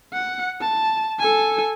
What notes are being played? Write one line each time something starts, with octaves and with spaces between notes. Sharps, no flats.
F#5
A5
A4 G#5